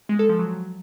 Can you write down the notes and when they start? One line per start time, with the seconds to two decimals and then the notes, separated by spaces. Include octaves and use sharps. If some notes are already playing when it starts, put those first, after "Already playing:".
0.09 G#3
0.19 A4
0.29 F3
0.39 F#3